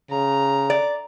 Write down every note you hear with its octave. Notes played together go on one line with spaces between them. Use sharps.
C#3 A#5
D5